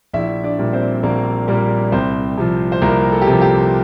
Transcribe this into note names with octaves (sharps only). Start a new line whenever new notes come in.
A#1 E4 E5
D4 D5
A#2 G3
C4 C5
A#1 A#3 A#4
A#2 G3 A#3 A#4
C2 C4 C5
C3 F3
C5
C2 A#3 A#4
A4
G4
C3 F3 A4
G4